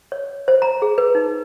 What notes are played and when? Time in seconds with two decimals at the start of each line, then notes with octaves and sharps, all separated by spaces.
0.12 C#5
0.48 C5
0.62 A#5
0.82 G#4
0.98 B4
1.15 D#4